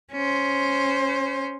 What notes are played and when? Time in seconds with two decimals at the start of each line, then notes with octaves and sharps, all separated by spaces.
0.12 C#4 C5